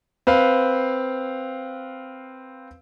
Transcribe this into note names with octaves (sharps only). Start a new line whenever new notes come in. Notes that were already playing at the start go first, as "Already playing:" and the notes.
C4 B4 F5